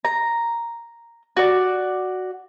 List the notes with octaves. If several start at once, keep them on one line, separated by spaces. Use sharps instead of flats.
A#5
F#4 D5